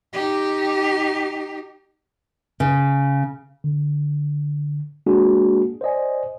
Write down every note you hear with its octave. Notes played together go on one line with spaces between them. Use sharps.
D#4 G4
C#3
D3
G#3 A#3 D4 F#4 G#4
C5 D5 D#5 G#5